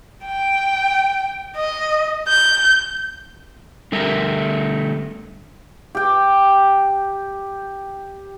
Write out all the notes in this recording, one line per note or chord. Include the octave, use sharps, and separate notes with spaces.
G5
D#5
G6
D3 G3 A3 A#4 E5
G4 G5